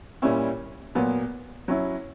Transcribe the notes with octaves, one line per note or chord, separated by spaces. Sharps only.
A#2 G3 C#4 E4
A#2 F#3 B3
F#3 C#4 E4